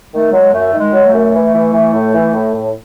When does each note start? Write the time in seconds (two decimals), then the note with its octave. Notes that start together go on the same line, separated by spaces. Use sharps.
0.13 D#3 A3
0.32 F#3 G#3
0.53 F#2 A3
0.73 D#3
0.79 G#3
0.93 F#3
1.07 A3
1.13 F#2
1.34 E3
1.53 E3
1.73 E3
1.93 A2
2.14 E3
2.33 A2
2.54 A2